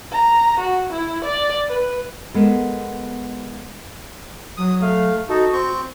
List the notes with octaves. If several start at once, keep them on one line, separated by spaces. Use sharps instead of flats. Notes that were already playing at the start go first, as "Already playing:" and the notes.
A#5
F#4
E4
D5
B4
G#3 B3 A4 A#4
F#3 D#6
A3 F5
D#4 F#4 A4
C4 C#6 G6